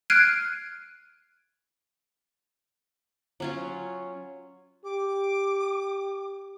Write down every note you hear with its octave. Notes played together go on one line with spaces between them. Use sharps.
F6 F#6 G#6 C7 D7 D#7
F#3 C#4 F4
G4 D6